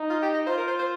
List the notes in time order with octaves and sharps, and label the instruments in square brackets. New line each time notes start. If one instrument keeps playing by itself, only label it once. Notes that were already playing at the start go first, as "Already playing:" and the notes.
Already playing: [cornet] D#4
[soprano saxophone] F4
G4
D#5
[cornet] F4 [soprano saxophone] C5
[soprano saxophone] A#4
C5
C5